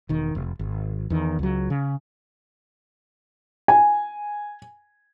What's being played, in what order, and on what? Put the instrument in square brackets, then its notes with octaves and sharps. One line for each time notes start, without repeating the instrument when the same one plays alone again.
[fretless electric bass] E1 D#3
F1
G#1
E2 D#3
C#2 F#3
C#3
[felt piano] G#5